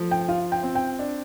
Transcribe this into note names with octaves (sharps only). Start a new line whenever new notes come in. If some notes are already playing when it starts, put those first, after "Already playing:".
Already playing: F3 A3
G5
F4 F5
G5
C4
G5
D4